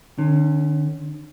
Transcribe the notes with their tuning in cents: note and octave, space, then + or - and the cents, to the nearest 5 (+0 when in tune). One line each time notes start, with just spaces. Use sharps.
D3 +45 C#4 +0